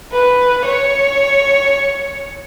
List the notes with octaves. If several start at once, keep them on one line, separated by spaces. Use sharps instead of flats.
B4
C#5